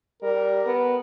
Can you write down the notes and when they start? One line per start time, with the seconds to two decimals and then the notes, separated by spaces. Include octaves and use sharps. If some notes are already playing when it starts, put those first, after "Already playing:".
0.22 G3 A#4
0.66 B3